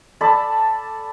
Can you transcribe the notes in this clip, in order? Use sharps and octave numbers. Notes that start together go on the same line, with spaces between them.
A4 D5 A5 B5